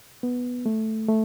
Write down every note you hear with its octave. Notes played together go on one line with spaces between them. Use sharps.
B3
A3
A3